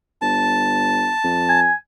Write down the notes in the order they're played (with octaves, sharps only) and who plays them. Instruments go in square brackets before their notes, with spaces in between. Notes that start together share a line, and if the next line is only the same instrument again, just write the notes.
[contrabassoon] G1 [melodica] A5
[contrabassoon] F2
[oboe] G#5